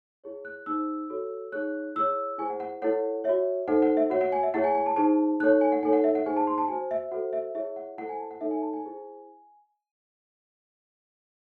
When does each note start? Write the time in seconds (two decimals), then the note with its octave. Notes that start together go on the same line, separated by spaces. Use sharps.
0.24 E4 G#4 C#5
0.45 F#6
0.66 D#4 G#4 C5 E6
1.10 F#4 A4 C#5
1.52 D#4 G#4 C#5 F#6
1.95 E4 G#4 C#5 E6
2.38 E4 G#4 C5 G#5
2.50 F#5
2.60 F#5
2.82 E4 A4 C#5 F#5
3.24 F#4 C#5 E5
3.68 D#4 A4 C5 F#5
3.82 F#5
3.97 E5
4.10 F#4 C#5 F#5
4.21 F#5
4.32 G#5
4.43 E5
4.54 E4 G#4 C#5 F#5
4.64 G#5
4.75 G#5
4.86 A5
4.96 D#4 G#4 C5 A5
5.40 D#4 A4 C#5 F#6
5.61 G#5
5.72 F#5
5.83 D#4 A4 C#5 G#5
5.93 F#5
6.04 E5
6.15 F#5
6.26 D#4 G#4 C5 G#5
6.37 A5
6.47 C6
6.58 A5
6.68 F#4 C5 G#5
6.91 E5
7.11 F#4 A4 C5 F#5
7.33 E5
7.55 E4 G#4 C#5 E5
7.76 F#5
7.98 E4 A4 C5 F#5
8.09 G#5
8.19 A5
8.31 F#5
8.41 D#4 A4 C#5 E5
8.51 G#5
8.62 A5
8.73 G#5
8.84 E4 G#4 C5